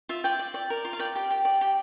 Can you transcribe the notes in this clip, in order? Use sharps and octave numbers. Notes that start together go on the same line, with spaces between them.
F4 E5
D5 G5
D5
D5
A#4
F4
F5
D5 G5
G4
G4
D5
G4